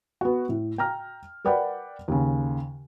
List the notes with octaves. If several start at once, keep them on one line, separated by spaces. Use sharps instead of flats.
B3 F#4
A2
G5 A#5 F6
A#4 B4 D5 F#5 G5 B5
D#2 C#3